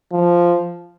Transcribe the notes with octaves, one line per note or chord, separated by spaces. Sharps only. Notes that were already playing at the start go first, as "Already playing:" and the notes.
F3